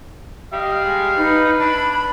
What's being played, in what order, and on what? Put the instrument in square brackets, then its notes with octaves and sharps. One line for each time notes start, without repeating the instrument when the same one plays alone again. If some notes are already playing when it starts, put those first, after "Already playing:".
[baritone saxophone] G3 [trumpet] D#5 [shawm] F5
[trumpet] G#3
[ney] D#4 [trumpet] B4
[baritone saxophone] D4 [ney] B5